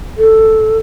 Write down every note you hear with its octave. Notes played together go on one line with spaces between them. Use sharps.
A4